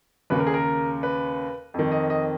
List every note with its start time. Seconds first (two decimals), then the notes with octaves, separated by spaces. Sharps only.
0.30 D#2 C#3 B4
0.39 A#4
0.47 G#4
0.54 A#4
1.03 B4
1.74 F2 D#3
1.92 D#5
2.10 D#5